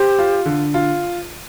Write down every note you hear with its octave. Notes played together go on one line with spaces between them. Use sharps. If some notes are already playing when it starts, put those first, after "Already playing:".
Already playing: G4 C5
F4
D3
F4